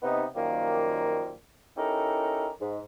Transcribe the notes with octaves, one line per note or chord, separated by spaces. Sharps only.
C3 B3 D#4
F#2 D#3 F3 G3 A#3
C#4 D#4 E4 G4 A4 A#4
G#2